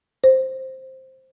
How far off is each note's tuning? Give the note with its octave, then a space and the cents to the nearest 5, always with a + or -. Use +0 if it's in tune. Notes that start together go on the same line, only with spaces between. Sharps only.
C5 +5